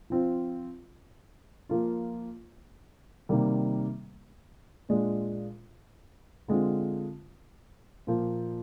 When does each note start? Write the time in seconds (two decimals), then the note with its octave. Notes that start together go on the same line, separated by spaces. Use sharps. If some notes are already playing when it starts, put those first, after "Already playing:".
0.10 F3 C4 F4
1.69 F3 A#3 F4
3.29 C3 D#3 G3 A#3
4.89 A#2 G#3 D4 F4
6.48 D3 G#3 C4 F4
8.07 A#2 F3 A#3